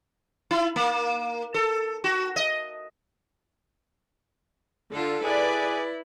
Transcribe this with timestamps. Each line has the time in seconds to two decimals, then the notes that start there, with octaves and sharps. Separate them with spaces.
0.51 E4
0.76 A#3
1.54 A4
2.04 F#4
2.36 D#5
4.93 D3 F4 A4
5.24 E4 G#4 B4 D5